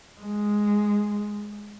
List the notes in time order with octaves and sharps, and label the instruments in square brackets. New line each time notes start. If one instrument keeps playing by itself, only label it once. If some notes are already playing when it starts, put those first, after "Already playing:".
[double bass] G#3